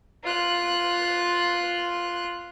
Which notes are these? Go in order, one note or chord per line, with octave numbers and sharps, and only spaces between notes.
F4 F#6